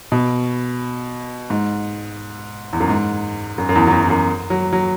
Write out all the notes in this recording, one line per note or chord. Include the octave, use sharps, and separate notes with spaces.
B2
G#2
E2
F#2
G#2
F#2
F#2
E2
F#2
E2
E2
F#2
F#3
F#3